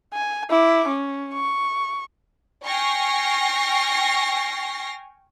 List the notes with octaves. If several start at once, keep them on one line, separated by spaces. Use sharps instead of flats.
G#5
E4 D6
C#4
C#6
G5 G#5 C#6 F6 A#6 C7